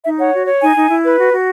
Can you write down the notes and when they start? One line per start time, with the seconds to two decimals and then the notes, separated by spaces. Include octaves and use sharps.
0.05 D#4 E5
0.19 C#5 F#5
0.33 F#4
0.47 C#5
0.61 D#4 G#5
0.75 D#4
0.89 E4
1.03 B4
1.18 F#4
1.32 F#4